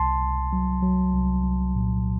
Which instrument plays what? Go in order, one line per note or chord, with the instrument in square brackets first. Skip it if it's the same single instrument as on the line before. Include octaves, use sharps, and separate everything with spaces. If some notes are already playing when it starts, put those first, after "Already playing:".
Already playing: [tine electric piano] C2 A5 C6
C2
F#3
F#3
C2
C2
A#2